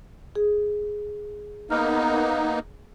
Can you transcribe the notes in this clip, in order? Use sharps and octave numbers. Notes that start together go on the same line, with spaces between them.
G#4
A#3 B3 D#4 F6